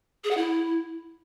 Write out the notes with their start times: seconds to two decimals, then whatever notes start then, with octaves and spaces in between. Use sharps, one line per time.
0.24 G#4
0.31 F#5
0.37 E4